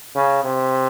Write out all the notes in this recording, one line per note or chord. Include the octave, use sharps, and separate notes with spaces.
C#3
C3